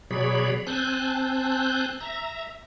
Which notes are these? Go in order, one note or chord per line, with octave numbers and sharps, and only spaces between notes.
B2 F#3 G#4 C#5 D5 B5
C4 G#5 A5 F#6 G6
E5 A#5